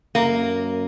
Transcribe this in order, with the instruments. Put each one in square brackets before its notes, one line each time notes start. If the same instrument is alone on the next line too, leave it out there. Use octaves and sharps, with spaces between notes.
[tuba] F#2 [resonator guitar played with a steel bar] A#3